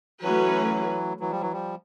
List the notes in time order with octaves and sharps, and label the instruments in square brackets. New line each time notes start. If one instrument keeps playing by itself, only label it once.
[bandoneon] E3 F#3 [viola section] A3 C#4 F#4 B4
[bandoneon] E3 F#3
F3 G3
E3 F#3
F3 G3